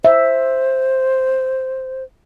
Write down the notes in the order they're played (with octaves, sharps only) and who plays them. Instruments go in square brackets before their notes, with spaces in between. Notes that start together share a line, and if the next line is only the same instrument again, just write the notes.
[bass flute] C5 [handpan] E5